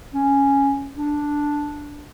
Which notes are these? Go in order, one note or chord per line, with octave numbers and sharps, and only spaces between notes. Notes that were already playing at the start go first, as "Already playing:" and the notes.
C#4
D4